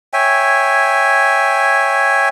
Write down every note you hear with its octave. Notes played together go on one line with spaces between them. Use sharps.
C#5 E5 G5 G#5